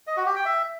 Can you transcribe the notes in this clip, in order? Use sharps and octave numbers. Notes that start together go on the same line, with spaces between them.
D#5
F#4
G4
G5
E5